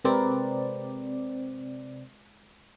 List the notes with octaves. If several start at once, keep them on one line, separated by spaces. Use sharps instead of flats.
C3 G#3 C4 A#4 B4 D5